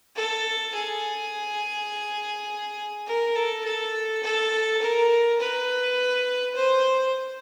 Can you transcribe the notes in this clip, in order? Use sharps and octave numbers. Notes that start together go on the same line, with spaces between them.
A4
G#4
A#4
A4
A4
A4
A#4
B4
C5